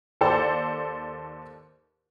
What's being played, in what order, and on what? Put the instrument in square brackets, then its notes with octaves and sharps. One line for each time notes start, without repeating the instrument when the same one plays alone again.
[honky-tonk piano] D#2 A4 C5 D5